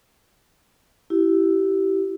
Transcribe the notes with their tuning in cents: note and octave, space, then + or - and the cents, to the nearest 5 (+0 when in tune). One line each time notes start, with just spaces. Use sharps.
E4 +0 G4 -25